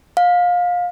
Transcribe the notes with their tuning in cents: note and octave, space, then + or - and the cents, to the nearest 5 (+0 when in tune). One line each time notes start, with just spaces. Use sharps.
F5 +25